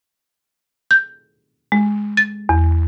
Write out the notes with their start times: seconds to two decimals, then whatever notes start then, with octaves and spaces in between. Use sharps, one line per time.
0.91 G6
1.72 G#3
2.17 A6
2.49 E2